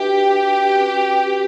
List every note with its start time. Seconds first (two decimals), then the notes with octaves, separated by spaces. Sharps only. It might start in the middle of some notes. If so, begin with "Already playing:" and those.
Already playing: D4 F#4 G4 B4 E5
0.75 C#4 F#4 B4